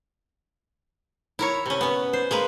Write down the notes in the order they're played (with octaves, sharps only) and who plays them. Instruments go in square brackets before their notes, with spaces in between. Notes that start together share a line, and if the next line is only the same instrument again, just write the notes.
[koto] E4 A#4 C#5
C3 C#4
B3 C#4
C5
G#3 A#3 B4